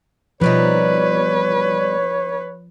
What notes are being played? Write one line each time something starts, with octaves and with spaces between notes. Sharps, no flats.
B2 F3 G3 D#4 B4 C#5